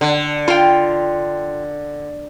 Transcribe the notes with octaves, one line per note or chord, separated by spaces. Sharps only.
D3
F4 G5